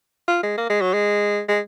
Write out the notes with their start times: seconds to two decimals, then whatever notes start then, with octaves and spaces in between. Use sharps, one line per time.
0.28 F4
0.43 G#3
0.58 A#3
0.69 G#3
0.81 F#3
0.94 G#3
1.48 G#3